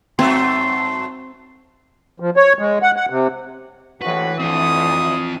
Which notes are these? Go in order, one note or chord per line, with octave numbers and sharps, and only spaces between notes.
G2 F#3 A3 C4 C6
F3
C#5
G#3
F#5
F#5
C3
A#1 A2 E3 F#4 B4
D2 C4 F4 D#6